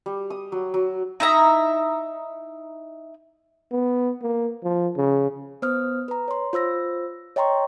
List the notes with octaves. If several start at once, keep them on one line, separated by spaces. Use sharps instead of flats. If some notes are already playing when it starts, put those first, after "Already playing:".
G3
D#6
F#3
F#3
D#4 E4 E5 A#5
B3
A#3
F3
C#3
B3 C5 D#6 F6
B4 A#5
C#5 C6
F4 C5 E6 A#6
C#5 D#5 G5 A#5 C6 C#6